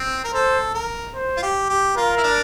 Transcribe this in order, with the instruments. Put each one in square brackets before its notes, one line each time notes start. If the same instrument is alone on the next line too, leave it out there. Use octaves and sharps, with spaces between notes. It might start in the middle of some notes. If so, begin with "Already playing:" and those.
Already playing: [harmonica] C4
A#4
[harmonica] A4 [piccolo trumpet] C5
[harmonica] A#4
[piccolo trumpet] C5
[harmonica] F4
G4
G4
[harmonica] F4 [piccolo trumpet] A#4
[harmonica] E4
D4